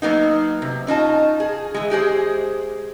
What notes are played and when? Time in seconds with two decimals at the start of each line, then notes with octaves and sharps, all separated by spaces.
0.02 F#3 A#3 B3 D#4
0.62 C3
0.87 C#4 D#4 F4 A5
1.40 G#4
1.74 E3 G#3
1.90 G#3 G4 G#4 C5